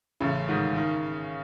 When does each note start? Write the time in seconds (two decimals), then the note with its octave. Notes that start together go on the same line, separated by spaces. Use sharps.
0.20 A1 C#3
0.49 G#2 D#3
0.76 D#3